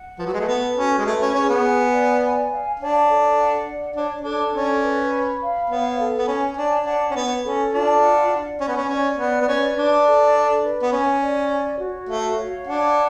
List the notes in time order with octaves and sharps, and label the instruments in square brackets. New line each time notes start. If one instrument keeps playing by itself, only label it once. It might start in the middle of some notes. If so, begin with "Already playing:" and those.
Already playing: [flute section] F#5
[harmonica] F3 [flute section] B4
[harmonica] F#3
G#3
A3
[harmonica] B3 [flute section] A4
[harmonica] C#4 [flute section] F#4
[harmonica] G#3
[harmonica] A3 [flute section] B4
[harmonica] C#4
[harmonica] C#4 [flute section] G#4
[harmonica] B3
[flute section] G#5
D5
G#5
F5
[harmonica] D4 [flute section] C#5
[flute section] A4
F#5
D5
[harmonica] D4 [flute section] C#5
[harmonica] D4 [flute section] A4
[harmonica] C#4 [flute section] D5
[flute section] B4
B5
F5
[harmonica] B3 [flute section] C#5
[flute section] A4
[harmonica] B3
[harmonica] C#4 [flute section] G#5
[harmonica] D4 [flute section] C#5
[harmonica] D4 [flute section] F#5
[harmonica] C#4
[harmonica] B3 [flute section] C#5
[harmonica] C#4 [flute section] A4
[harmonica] D4 [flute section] F4
[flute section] F#5
D5
[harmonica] C#4 [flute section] G#5
[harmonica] B3
C#4
[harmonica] C#4 [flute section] D5
[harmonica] B3 [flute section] D5
[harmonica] B3
[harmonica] C#4 [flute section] B4
[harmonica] D4 [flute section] D5
[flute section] A4
D5
B4
[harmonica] B3
[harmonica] C#4 [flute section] G#5
[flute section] D5
C#5
F#4
[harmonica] A3 [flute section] F5
[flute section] C#5
[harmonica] D4 [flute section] F#5